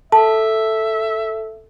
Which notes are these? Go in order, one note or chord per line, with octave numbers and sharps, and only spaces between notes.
A4 E5 A5